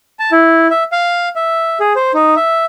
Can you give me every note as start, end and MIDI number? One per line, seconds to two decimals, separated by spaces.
0.19 0.31 81
0.32 0.67 64
0.70 0.84 76
0.92 1.29 77
1.36 1.78 76
1.80 1.93 68
1.96 2.12 72
2.14 2.35 63
2.36 2.65 76